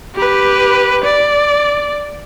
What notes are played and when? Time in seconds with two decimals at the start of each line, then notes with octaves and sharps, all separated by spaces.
0.15 G4 B4
1.04 D5